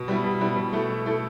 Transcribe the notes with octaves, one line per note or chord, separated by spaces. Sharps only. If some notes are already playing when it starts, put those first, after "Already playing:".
Already playing: B2
G3 B3 E4
B2
G3 B3 E4
B2
A3 E4 A4
B2
A3 E4 A4